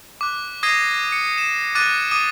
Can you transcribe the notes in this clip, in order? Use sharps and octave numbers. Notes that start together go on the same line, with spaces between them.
D6 F#6
D#6 G#6 A#6 C7 D#7 G7
C#7
E7
D6 F#6 A6 D#7
D6 D#6 D#7